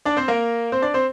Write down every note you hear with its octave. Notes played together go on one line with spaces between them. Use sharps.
D4 D5
C4 C5
A#3 A#4
C4 C5
D4 D5
C4 C5